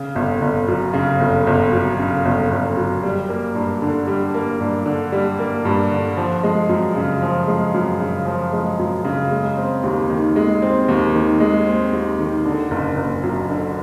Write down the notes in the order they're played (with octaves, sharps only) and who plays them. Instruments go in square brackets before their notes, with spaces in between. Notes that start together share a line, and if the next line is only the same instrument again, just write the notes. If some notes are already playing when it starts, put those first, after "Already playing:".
Already playing: [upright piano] C#3
G1
G1
F#2
C#3
G1
G1
F#2
C#3
G1
G1
F#2
G3
A#3
G2
D3
G3
A#3
G2
D3
G3
A#3
G2
D3
F3
G#3
F#2
C#3
F3
G#3
F#2
C#3
F3
G#3
F#2
C#3
G#3
C4
D#2
D#3
G#3
C4
D#2
D#3
G#3
C4
D#2
D#3
D3
F#1
F#1
F#2
D3